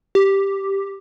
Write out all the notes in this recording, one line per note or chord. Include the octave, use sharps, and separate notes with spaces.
G4